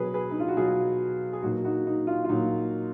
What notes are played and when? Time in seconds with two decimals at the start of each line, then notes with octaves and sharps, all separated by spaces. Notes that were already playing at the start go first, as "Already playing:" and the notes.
Already playing: B2 F#3 G#4 B4
0.14 G#4 B4
0.31 D#4
0.40 F4
0.48 F#4
0.57 B2 F#3 F4 G#4
1.33 G#4
1.43 A#2 F#3 D#4 F#4
1.64 D#4 F#4
1.87 D#4
2.07 F4
2.24 F4
2.29 A#2 F#3 D#4 F#4